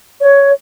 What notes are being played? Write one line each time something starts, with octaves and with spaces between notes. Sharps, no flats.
C#5